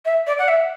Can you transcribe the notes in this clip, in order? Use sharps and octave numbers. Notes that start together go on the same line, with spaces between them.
E5
D5
F#5
E5